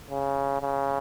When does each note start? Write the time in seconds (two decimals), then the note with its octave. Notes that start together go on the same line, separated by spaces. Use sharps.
0.10 C#3
0.62 C#3